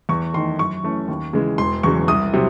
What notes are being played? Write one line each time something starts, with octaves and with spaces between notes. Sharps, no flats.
E2 C#6
D#3 A3 D#4 C6
F#2 C#6
E3 A3 C#4
D#2
C#3 E3 G#3
E1 C6
E2 C#3 F#3 C#6
C2 D#6
C3 F#3